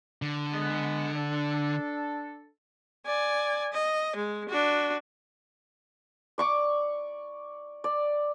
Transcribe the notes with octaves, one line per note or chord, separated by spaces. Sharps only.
D3
G#3 B3
D4 A4
D5 G#5
D#5
G#3
D4 F#4
D5 C#6 D6
D5